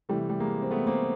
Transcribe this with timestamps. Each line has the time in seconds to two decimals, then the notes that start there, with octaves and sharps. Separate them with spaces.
0.09 C3 E3 G3 A3
0.29 G3
0.40 G#3 A#3
0.62 C4
0.71 A3 B3
0.87 A#3 C4